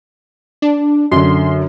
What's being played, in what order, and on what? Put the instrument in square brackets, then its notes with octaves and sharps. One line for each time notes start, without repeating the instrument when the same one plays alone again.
[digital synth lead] D4
[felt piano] F#2 D3 [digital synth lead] C6